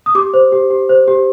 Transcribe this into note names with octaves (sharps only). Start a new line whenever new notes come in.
D#6
G4 D6
C5
G4
G4
C5
G4